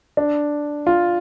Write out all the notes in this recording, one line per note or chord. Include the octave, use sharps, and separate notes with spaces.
D4
F4